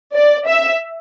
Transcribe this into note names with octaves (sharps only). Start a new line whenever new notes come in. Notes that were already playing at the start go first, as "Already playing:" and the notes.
D5
E5